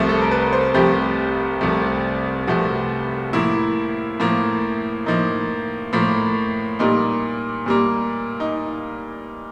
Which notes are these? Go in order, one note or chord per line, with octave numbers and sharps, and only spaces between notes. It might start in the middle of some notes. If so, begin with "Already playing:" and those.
Already playing: C2 C3 F3 A3
A4
A#4
B4
C5
C2 C3 F3 A3 G4
C2 C3 F3 A3
C2 C3 F3 A3 F#4
A2 F3 A#3 E4
A2 F3 A#3
A2 F3 A#3 D#4
A2 F3 A#3
A#2 G3 A#3 D#4
A#2 G3 A#3
D#4